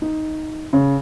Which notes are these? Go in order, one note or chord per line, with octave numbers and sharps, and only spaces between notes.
D#4
C#3